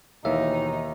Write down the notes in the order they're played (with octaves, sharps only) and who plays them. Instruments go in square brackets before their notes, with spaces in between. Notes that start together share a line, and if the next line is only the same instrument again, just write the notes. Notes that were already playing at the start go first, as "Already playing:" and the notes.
[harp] D#2 [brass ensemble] B2 E3 [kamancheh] D#4 [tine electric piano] E5